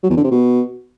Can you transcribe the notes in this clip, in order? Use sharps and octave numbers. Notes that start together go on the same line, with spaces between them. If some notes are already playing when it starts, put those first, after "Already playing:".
F#3
E2
D3
C3
B2